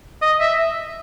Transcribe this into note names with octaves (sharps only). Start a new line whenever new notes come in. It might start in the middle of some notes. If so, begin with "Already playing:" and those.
D#5
E5